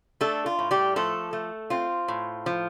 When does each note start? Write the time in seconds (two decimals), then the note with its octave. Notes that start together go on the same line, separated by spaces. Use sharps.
0.21 A3 D4 A4
0.46 F4
0.59 A2
0.71 G3 G4
0.96 F3 A3 A4
1.33 A3
1.70 C4 F4
2.08 A2
2.46 F3